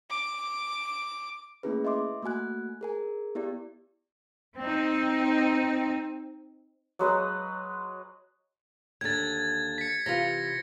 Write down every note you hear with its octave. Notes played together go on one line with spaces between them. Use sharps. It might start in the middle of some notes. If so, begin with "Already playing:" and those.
D6
A3 A#3 C#4 E4 G#4 B4
D#5 E5 C6 D6
A3 A#3 F#4 G#5 F#6
G#4 A#4 G#5
B3 E4 G4 D5
C4 D#4
F#3 G#3 B4 D#6
D#2 D3 G#6 A6
B6 C#7
C3 E3 F4 A#6